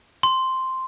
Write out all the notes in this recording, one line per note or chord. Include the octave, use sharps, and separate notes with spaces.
C6